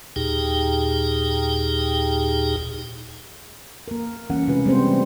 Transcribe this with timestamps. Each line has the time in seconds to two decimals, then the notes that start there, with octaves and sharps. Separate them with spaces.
0.16 D#2 A#2 D#4 G4 G#4 G5
3.88 A#3 A#4
4.30 E3 G3 A#3 C#4 F#5
4.48 C3 G#3 F4 B4
4.66 G3 G#3 B3 C4 C5
4.87 A3